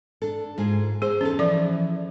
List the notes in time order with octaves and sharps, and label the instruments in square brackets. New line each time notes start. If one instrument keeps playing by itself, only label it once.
[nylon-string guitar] D4 A4
G#2 F4 G#4
[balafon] G#4 [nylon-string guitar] C5
[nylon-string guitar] E2 D#4 A4 [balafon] C#4
[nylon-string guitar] E3 [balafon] F3 D5